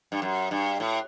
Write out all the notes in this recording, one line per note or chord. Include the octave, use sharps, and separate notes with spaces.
G2
F#2
G2
A2